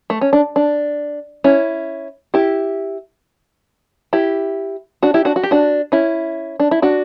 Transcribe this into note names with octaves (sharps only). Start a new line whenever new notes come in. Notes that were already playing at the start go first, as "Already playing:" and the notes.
A3
C#4
D4
D4
C#4 E4
E4 G4
E4 G4
D4 F#4
E4 G4
D4 F#4
F#4
G4
D4 F#4
C#4 E4
D4
E4
D4 F#4